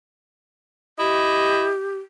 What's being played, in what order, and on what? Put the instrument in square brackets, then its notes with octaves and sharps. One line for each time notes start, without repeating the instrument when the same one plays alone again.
[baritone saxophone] E4 [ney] G4 [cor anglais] D#5